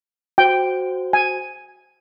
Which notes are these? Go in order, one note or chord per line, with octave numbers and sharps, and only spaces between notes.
F#4 C5 G5
G#5